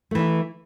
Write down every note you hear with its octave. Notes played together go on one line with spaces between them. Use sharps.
E3 A3 E4